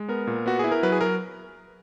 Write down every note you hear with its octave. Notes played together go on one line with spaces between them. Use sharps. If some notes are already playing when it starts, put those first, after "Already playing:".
Already playing: G#3
B3 A#4
A#2
B3 F#4
E4 G#4
A#4
F#3 B4
G#4
F#3 A#4